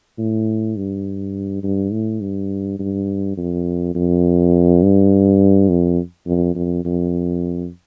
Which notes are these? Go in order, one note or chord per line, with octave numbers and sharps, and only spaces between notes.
A2
G2
G2
A2
G2
G2
F2
F2
G2
F2
F2
F2
F2